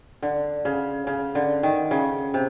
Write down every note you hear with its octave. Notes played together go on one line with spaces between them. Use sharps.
D3
C#3
C#3
D3
D#3
C#3
C3